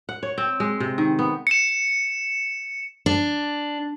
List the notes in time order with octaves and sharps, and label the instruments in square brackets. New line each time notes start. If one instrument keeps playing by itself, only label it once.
[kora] F#5
C#5
C4
G#3
C3
D#3
B3
[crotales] C#7 E7
[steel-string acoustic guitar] D4